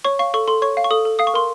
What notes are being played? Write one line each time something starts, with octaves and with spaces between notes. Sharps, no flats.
C#5 C#6
F5 C#6
A4 C#6
A4 C6
C#5 C#6
F5
C#6
A4 D#6
A4
F5 D#6
C#6
A#4 C6